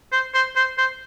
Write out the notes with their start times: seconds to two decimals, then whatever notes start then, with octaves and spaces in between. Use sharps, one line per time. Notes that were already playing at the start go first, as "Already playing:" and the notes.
0.12 C5
0.34 C5
0.56 C5
0.78 C5